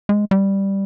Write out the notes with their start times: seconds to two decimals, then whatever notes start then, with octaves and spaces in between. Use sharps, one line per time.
0.09 G#3
0.31 G3